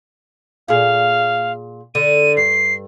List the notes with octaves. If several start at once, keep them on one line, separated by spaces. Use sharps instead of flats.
A#2 G#4 F5
D3 D#7
G2 C7